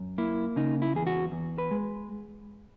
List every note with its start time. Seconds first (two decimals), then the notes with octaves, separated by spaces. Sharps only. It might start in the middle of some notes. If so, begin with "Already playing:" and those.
Already playing: F#2
0.18 A#3 E4
0.56 C#3 D#4
0.82 E4
0.95 E2 G#4
1.07 F#4
1.32 E2
1.58 B4
1.71 G#3